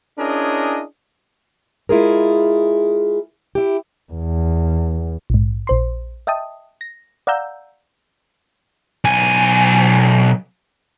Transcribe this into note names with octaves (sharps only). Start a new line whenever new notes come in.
C#4 D4 E4 G#4 A#4 D#5
G#3 E4 F4 G#4 A#4
E4 G4
E2
A#1 G#2
A#1 C5 C6
D#5 E5 G5 A5 D#6
A#6
D5 F5 F#5 A#5 E6 G6
B1 G#5